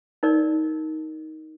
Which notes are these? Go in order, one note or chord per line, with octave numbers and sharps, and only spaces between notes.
D#4 A#4 D5